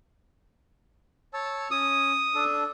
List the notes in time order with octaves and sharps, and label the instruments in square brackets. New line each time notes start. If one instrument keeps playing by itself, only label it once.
[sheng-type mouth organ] C#5 A5 E6
[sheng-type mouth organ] C#4 [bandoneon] D#6
[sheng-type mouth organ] D4 A4